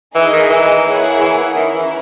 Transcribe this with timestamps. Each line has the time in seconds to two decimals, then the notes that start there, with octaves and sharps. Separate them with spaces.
0.15 E3 D#4 G#4 D#5
0.33 D#3
0.50 E3
0.86 A#3 E4 G#4 C#5 F#5
1.21 E3
1.38 E3
1.55 D#3 C#4 E4 A#4
1.74 E3